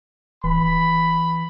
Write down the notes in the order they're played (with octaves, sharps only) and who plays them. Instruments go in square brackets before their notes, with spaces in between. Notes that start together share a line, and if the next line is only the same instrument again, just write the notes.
[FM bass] D1 [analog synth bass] E3 [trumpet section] B5